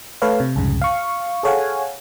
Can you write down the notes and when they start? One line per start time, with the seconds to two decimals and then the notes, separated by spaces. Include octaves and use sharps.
0.22 A3 A4 B4 C#5 F5
0.40 C3
0.56 C2 F2 G#2 C#3
0.82 F5 C#6
1.43 G#4 A4 C#5 F5 F#5 G#5